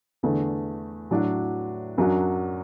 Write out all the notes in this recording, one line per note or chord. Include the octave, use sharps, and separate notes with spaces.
E2 D3 A3
A2 F#3 D4 F#4
F#2 F#3 D4 F#4